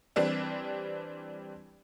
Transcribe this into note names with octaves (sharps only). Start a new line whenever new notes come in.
E3 G3 C4 D4